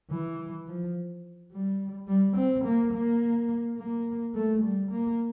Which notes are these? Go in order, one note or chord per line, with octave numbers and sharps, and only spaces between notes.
E3
F3
G3
G3
C4
A#3
A#3
A#3
A3
G3
A#3